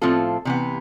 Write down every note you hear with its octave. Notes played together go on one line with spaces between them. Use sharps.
A2 F3 C4 F4 A4
C3 E3 B3